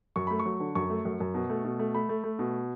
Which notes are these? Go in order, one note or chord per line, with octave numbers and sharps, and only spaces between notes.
F#2 C#6
A3 B5
C#6
F#3
D3
F#2 C#6
A3
F#2
F#2
B2
A3
B2
A3
A3 B5
A3
A3
B2